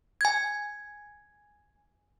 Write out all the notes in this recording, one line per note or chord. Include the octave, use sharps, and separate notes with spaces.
G#5 G#6